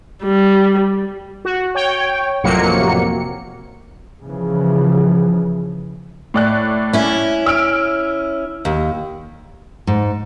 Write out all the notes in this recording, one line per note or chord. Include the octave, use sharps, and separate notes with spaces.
G3
F#4
C#5 G5
A1 F2 C3 F#3 A#3 C#7
C#3 E3 F3
A2 D5 F#6
C#4 E4
E6 F6 D7
D#2
G#2